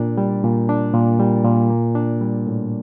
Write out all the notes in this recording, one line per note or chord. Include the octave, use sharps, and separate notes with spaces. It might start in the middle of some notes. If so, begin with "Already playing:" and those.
Already playing: A#2 D4
G3
A#2
D4
A#2
G3
A#2
A#3
D4
G3
A2